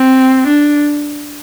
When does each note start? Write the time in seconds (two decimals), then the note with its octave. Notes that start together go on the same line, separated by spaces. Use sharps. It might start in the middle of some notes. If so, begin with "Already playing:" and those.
Already playing: C4
0.47 D4